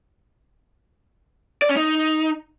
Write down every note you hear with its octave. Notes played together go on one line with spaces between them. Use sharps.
D5
C#4
D#4